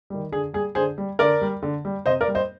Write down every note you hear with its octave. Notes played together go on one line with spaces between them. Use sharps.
D#3 G3
D3 G#4
G3 G#4
D3 G#4 C5
G3
D3 A#4 D5
G3
D3
G3
C3 C5 D#5
A#4 D5
G3
C5 D#5